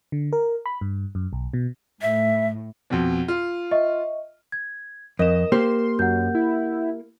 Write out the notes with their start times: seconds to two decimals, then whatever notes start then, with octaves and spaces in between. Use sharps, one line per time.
0.12 D3
0.33 A#4
0.66 B5
0.81 G2
1.15 F#2
1.33 B1
1.54 B2
2.02 A2 E5
2.90 F2 B2
3.28 F4
3.71 D#5 E5 C#6
4.52 G#6
5.19 F2 A#4 D#5 E7
5.52 A#3 G4 C5 C6
5.99 F#2 F#5 G6
6.35 E4